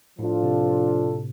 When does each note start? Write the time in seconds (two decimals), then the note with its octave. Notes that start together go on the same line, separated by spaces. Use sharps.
0.19 A2 F3 D4 F4 A4
0.43 C3